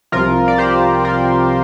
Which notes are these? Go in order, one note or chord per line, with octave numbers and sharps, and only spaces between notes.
C2 C3 F3 F4 A#4
D5
G4 C5
A#4 D5